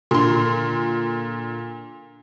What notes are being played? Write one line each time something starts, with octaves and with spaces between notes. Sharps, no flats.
A#2 D3 C6